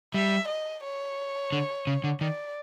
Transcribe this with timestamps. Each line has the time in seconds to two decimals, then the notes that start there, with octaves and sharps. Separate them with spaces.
0.14 G3 E5
0.48 D#5
0.84 C#5
1.52 D3
1.87 C#3
2.04 D3
2.21 D#3 D5